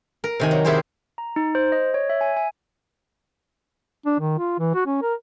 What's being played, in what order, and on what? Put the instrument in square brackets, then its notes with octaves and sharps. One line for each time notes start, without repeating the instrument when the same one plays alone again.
[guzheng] A#4
C3 D#3 G#5
F#3
C3 D#3 E4 G4 G#4 C5
[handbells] A#5
D#4
C5
D#5
C#5
E5
G#5
G#5
[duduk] D4
D#3
F4
E3
F#4
C#4
A#4